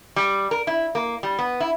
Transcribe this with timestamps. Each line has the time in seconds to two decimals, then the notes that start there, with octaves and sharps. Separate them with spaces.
0.16 G3
0.51 A#4
0.67 E4
0.95 A#3
1.23 G3
1.39 B3
1.60 E4